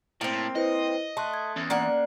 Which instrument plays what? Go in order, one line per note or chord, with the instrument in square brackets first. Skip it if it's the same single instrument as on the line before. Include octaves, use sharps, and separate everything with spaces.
[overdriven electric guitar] A2 [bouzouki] A#3 C4
[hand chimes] E4 B4 C5 [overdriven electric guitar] D#5
[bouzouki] A3 [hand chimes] A5 C6 F#6
[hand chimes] G#6
[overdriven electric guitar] E2 [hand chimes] C#4
[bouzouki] A#3 D4 F#5